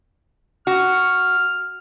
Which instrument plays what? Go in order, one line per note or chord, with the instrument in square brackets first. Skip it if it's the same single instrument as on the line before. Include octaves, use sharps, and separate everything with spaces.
[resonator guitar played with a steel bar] F#4 [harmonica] F6